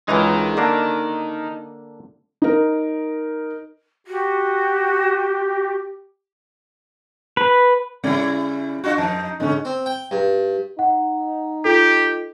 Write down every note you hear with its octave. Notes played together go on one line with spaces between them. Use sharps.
C#2 E3 G#3 D#4 A#4
D3 A#3 D4
D#4 A#4
F#4 G4
B4
C#3 G3 C#4 E4 D5
D4 F4 F#4
F2 D#4 A5
D3 G#3 C#4 D#4
C4
G5
G2
D#4 F#5
F4 G4 A4